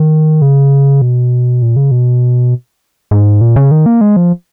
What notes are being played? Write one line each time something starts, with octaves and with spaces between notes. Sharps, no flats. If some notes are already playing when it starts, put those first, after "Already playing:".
Already playing: D#3
C#3
B2
A#2
C#3
B2
G#2
A#2
C#3
D#3
A#3
G#3
F3